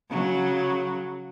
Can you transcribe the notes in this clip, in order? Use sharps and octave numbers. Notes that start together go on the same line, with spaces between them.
C#3 F#3